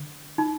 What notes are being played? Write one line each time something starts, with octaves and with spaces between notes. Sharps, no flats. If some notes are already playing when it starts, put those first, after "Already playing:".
Already playing: D3
D#4